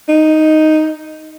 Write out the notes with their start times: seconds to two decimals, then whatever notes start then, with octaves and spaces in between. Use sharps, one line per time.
0.08 D#4